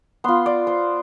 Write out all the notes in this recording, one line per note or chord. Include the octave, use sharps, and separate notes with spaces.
B3 F4 C6
D5
C5